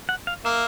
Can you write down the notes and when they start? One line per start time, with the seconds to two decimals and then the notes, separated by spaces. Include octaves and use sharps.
0.09 F#5
0.27 F5
0.45 A#3 E5